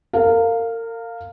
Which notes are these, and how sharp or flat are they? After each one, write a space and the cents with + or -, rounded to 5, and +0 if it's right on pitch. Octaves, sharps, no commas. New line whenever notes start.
A#4 -35 F5 +0